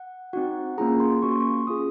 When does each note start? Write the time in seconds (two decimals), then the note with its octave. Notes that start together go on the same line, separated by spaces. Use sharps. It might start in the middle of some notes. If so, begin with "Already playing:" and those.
Already playing: F#5
0.33 C4 D#4 F#4 F#5
0.78 A#3 C#4 F4 G#4 A#5
1.00 C6
1.22 A#3 C#4 F#4 C#6
1.31 C6
1.40 C#6
1.67 C#4 F4 G#4 D#6